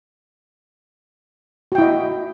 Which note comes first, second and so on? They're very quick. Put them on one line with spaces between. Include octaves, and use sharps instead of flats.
F#4 G5 E4 D#5